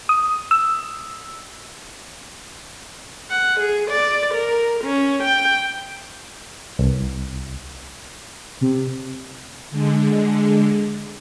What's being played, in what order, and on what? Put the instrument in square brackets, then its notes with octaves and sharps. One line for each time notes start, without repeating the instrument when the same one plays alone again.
[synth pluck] D#6
E6
[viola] F#5
G#4
D5
A#4
C#4
G5
[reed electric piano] C2
[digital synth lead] C3
[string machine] D3 G#3